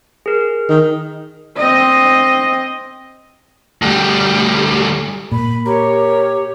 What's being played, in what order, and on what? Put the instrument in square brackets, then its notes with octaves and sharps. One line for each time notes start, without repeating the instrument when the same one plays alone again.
[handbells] G#4 A#4
[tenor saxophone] D#3
[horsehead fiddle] C4 D#5
[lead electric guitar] D2 G3
[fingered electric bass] A#2 [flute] B5
[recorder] G4 [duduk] A#4 [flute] C#5